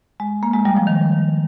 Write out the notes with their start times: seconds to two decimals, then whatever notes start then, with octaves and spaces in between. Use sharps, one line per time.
0.20 G#3
0.43 A#3
0.53 G#3
0.65 G3
0.77 F3
0.87 D#3